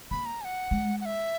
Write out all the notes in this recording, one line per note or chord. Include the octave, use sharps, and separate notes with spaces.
A#3 B5
A#5
G#5
F#5
G#3
F#5
E5